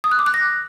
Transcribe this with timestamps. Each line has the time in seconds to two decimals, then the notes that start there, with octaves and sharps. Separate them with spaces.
0.04 D#6
0.11 F#6
0.19 D6
0.26 F#6
0.34 A#6